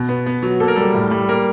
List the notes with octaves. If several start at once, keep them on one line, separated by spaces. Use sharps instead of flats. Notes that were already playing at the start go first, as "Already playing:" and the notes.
Already playing: B2
B3
B3
F#3
A#3 A4
A#4
G3 A4
A2
G3
A#3 A#4